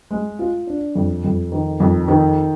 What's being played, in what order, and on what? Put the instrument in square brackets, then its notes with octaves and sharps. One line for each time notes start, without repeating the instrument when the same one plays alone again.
[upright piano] G#3
F4
D4
F2
F2
D#3
F2
D#3